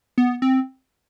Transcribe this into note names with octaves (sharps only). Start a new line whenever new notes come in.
B3
C4